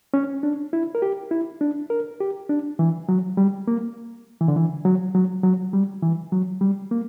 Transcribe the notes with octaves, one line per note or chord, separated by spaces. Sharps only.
C#4
D4
E4
A#4
G4
E4
D4
A#4
G4
D4
E3
F#3
G3
A#3
E3
D3
E3
F#3
F#3
F#3
G3
E3
F#3
G3
A#3